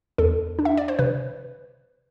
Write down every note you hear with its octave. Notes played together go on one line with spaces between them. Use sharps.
E2 A4
D4
E5
D5
C5
C3 B4